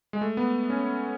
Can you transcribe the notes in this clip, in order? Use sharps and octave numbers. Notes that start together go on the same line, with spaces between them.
G#3
A3
B3
C#4